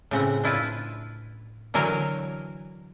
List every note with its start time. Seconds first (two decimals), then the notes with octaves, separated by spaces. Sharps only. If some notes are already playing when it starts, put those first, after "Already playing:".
0.11 A2 C#3 C4 F#5
0.44 D4 E4 F4 B4
1.74 D3 E3 F#3 A#4 C#5 G#5